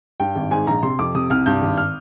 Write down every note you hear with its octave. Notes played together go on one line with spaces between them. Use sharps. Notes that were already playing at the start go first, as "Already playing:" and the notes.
G2 G5
G#1
G#2 G#5
A#1 A#5
C3 C6
F2 D6
C3 D#6
C2 F6
G2 G6
G#1
F6